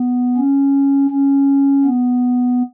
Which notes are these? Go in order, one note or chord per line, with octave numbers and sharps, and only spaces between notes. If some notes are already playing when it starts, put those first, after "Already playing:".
Already playing: B3
C#4
C#4
B3